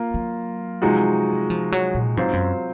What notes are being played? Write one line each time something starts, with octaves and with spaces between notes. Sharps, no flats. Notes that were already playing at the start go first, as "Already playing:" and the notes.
Already playing: A#3 F4
F#3
C3 F3 G#3 D#4 F#4
F3
F#3
A#2
G#2 F#3 C4 F4 C5
F#2